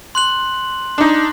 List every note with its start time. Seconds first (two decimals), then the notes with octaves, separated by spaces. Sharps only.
0.15 C6 F#6 F#7
0.98 D4 D#4